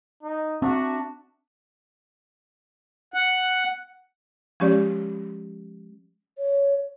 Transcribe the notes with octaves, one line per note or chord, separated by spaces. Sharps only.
D#4
C4 D4 F#4 E5 A#5
F#5
F3 G#3 C#4 G4 C#5 D5
C#5